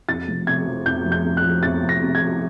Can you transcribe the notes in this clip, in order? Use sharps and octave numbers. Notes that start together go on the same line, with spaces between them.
F2 A6
F1
C3 G#6
F3
F2 G6
F1
G6
C3
F#6
F3
F2 A6
F1
A#6
C3
G#6
F3